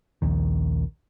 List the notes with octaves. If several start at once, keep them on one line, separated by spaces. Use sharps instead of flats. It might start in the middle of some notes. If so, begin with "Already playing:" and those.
A#1 D#2 D#3